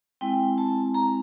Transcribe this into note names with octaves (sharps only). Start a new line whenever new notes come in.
G#3 C4 E4 G5
A5
A#5